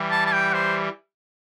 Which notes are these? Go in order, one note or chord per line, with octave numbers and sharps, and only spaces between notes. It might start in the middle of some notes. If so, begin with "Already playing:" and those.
Already playing: E3 G3
A5
A5
G5
C5